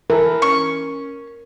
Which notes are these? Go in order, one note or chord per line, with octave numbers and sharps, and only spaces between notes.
E3 E4 A4 A#4
C#4 C#6